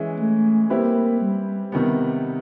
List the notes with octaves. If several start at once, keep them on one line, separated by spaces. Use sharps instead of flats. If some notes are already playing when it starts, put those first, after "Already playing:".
Already playing: E3 G#3 C#4 E4 G#4
A3
G3 A#3 C4 E4 G4 B4
G3
C3 D#3 G3 B3